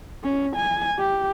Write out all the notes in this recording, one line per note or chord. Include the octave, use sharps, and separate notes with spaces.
C#4
G#5
G4